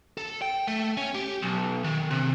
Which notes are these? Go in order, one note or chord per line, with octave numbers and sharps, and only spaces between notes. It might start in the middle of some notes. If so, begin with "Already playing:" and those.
A4
G5
A3
C#4
G4
B1
D#3
C3